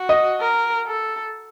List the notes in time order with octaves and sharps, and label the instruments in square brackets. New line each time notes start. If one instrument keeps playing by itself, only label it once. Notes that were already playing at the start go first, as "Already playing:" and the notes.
Already playing: [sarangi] F#4
[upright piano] D#5
[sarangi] A#4
A4